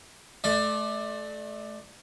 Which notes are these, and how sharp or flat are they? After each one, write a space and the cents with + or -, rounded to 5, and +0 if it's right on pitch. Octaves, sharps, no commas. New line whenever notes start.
A3 -30 D5 +15